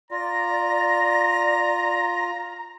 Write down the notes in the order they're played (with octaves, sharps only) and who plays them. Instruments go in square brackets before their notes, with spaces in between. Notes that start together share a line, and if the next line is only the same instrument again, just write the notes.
[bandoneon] F4 [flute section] D5 [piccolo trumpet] A#5 [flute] A#6